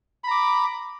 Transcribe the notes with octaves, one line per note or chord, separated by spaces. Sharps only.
A#5 B5 D6